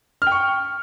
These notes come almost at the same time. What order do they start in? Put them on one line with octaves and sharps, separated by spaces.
F6 G5 C#6